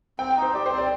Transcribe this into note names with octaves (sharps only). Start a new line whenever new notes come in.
C4 G5
G5
D#4
C5
G4 D5
C5
C4
D5